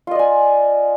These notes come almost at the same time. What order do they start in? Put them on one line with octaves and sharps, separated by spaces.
F4 D#5 D5 G#5